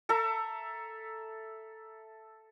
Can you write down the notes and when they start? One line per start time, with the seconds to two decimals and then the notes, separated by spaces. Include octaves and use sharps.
0.09 A4 E5 A#5